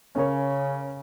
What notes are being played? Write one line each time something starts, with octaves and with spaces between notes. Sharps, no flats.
C#3 C#4 A#4 C#5